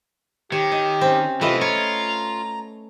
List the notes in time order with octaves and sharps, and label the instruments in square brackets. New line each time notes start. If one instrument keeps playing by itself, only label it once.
[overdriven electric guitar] D#3 [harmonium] G4 [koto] C#5
[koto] D#5
C4 C#4
[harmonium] C3 F4 [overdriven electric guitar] E3 [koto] A3 B4 D#5
[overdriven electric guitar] F4 [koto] C#5 [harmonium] A#5